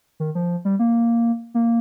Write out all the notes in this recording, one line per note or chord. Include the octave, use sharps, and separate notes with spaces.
D#3
F3
G3
A#3
A#3